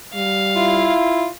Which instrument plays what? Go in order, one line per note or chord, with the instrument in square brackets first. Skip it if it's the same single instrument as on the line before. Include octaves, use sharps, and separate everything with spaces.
[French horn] G3 [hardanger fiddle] F5
[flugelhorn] E4 [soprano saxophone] F4